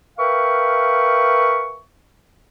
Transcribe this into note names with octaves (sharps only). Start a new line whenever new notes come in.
A#4 B4 E5 F5 G5 C#6